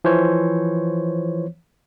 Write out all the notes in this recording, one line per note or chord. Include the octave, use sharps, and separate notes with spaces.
E3 F3 C5 C#5